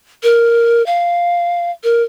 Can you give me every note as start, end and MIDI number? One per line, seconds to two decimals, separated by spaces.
0.23 0.85 70
0.86 1.71 77
1.84 2.03 70